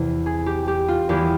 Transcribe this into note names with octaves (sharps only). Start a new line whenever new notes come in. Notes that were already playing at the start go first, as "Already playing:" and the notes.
Already playing: E2 C3 E3
G#4
G4
G4
F4
E2 E3 G4